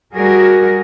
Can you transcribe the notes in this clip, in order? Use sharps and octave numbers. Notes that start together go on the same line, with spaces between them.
G3 F#4 G#4 A#4